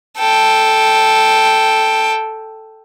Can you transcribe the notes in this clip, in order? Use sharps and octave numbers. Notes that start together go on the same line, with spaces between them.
A4 G5